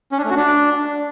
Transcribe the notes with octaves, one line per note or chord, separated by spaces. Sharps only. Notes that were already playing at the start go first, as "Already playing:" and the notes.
C#4
D4
A3
F#4
D4